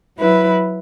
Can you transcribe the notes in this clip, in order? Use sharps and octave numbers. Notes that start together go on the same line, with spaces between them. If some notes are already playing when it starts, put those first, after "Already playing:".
F#3 E4 B4